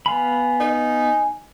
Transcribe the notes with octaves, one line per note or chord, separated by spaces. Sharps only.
B3 F5 G#5 B5
D#4